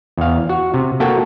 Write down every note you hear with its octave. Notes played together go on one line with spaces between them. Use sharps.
E2 F5
F#4
C3
A#3 F#4 A4 G5 A5